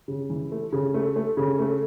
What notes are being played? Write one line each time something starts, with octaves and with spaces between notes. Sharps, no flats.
C#3
E3
A3
C#3
A3
A3
C#3
A3